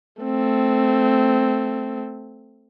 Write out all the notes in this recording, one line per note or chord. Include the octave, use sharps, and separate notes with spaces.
A3 C4